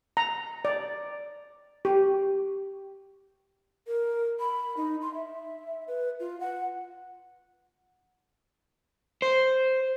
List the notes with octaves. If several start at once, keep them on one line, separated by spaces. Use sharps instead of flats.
A#5
D5
G4
A#4
B5
D#4
C6
E5
B4
F4
F#5
C5